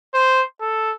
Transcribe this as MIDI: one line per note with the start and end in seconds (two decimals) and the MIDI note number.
0.14 0.42 72
0.61 0.92 69